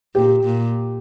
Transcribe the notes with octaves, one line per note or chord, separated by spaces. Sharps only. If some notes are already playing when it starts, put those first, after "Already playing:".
A#2 G4
A#2